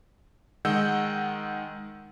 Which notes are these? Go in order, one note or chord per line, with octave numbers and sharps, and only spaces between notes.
D#3 G#3 D#5 F#5 E6 G6